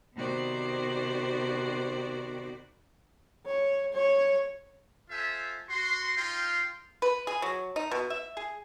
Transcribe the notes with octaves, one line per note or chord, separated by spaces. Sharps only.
C3 D#3 B3 F#4 C5 D5
C#5
C#5
F4 A4 C5 E5 G#5
F#4 C6
D#4 F4 F5 G5 C6
B4
G#4
F#3
D#4
B2
E5
G#4